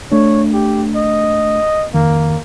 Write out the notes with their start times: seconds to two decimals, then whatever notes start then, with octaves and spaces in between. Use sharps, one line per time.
0.12 A3 D4 C#5
0.53 G4
0.95 D#5
1.94 F2 D#3 A#3